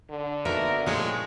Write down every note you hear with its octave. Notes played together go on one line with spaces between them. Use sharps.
D3
D#3 A#3 B3 F#4 A#4 E5
A#2 F3 G#3 A3 G4 C#5